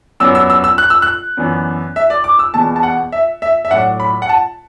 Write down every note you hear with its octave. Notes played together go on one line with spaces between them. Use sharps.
F#2 F#3 B3 D4 E6
E6
E6
E6
F#6
E6
F#6
F#2 E3 B3 D4
E5
D5
D6
E6
E2 B2 B3 D4 A5
A5
F#5
E5
E5
E5
A2 F#3 D4 F#5
B5
F#5
A5